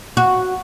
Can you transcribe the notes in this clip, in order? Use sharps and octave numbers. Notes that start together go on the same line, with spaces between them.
F#4